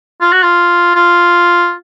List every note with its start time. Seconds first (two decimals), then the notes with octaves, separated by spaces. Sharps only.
0.21 F4
0.33 F#4
0.43 F4
0.96 F4